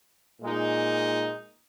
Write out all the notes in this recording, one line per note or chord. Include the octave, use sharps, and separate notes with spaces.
A#2 G#3 D#4